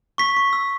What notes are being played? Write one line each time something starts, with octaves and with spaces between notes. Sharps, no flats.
C#6 B6
C#6
E6